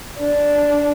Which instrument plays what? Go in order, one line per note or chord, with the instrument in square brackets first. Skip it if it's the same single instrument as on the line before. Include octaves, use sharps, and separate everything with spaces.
[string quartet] D4